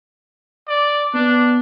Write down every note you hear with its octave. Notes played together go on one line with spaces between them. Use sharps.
D5
B3 D4